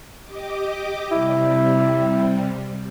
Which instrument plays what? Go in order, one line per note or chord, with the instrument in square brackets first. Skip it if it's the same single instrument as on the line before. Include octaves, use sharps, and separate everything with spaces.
[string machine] G4 D#5 D6
[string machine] C3 G3 [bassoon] E4